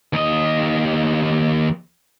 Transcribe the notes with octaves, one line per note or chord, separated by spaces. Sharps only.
D#2 D#5